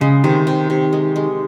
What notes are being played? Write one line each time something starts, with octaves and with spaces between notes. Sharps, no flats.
C#3 G#3
C3 D#3
C3
C3
G#3
G#3